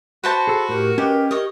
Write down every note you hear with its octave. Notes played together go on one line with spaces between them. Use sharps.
F#4 B4 C5 A5
G#4 A4
A2 G4 A#4
C#4 G4 B4 D#5
G4 C#5 D#5